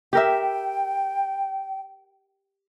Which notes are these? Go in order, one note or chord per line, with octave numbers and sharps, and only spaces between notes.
G4 A#4 E5 G5